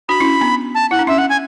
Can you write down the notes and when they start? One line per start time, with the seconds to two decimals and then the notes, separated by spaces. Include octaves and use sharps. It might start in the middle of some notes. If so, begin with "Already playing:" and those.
0.09 D4 F#4 B5
0.20 C#4 E4
0.41 B3 D4
0.75 A5
0.91 E4 F#5
0.99 D4
1.07 C#4 E5
1.18 F#5
1.29 G#5